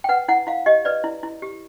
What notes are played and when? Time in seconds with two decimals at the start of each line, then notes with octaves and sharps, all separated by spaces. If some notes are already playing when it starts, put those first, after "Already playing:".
0.04 G5
0.09 B4 F#5
0.28 E4 F#5
0.47 E4 F5
0.66 G4 D#5
0.85 B4 D5
1.04 E4
1.23 E4
1.42 G4